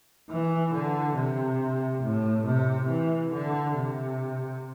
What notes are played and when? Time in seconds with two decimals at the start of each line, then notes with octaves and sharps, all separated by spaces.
0.30 E3
0.74 D3
1.16 C3
2.03 A2
2.47 C3
2.89 E3
3.33 D3
3.76 C3